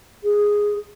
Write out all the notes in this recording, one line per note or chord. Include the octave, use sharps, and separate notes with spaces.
G#4